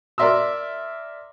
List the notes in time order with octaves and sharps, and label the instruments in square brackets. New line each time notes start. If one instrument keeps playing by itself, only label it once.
[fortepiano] A#4 D5 E5 C6 E6